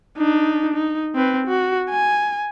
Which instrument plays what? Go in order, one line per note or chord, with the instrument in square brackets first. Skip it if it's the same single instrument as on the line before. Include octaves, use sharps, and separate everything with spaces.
[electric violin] D4 D#4
D#4
C4 B4
F#4
G#5